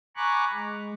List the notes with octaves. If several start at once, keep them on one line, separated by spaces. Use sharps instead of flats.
G#5 A#5 B5 C#6 D6 F#6
G#3